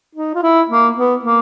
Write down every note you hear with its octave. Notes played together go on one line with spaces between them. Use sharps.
D#4
F4
E4
A#3
B3
A#3